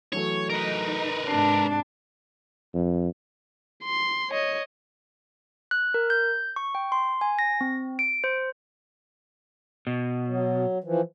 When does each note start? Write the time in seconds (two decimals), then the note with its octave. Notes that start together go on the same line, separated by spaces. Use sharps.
0.12 E3 F#3 A3 C#5
0.50 D#4 A#4 B4
1.28 G#2 C3 D4 C7
2.74 F2
3.84 C6
4.31 C#5 D#5
5.71 F#6
5.94 A#4
6.10 G6
6.56 C#6
6.75 G5
6.92 C6
7.21 G#5
7.39 A#6
7.61 C4
7.99 D7
8.24 C5
9.87 B2
10.27 F#3
10.84 E3 F3